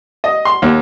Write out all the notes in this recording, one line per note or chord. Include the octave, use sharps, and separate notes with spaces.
D#5
C6
D#2